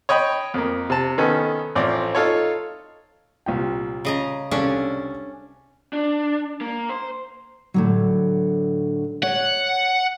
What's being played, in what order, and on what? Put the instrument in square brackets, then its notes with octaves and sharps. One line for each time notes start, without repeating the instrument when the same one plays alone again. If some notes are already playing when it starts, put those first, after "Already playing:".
[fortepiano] C#5 D#5 G5 B5
F2 A#3
C3 A5
D#3 B3 C#4 A4
A1 F3 C4 D5
D#4 F4 A4 C#5
C2 A#2 G5
[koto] C#3 D#5 A#5
[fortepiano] C2 C#3 A4 [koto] C#4 D4
[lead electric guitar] D4
A#3
C5
[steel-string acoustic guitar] A2 D3 F#3
[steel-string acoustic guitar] C#5 [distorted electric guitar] F#5